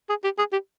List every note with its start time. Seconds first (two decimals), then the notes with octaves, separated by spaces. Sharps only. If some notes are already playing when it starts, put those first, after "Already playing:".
0.09 G#4
0.24 G4
0.38 G#4
0.52 G4